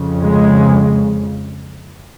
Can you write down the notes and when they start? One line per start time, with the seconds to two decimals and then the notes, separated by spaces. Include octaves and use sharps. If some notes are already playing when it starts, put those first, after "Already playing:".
Already playing: F2 C#3
0.23 G#3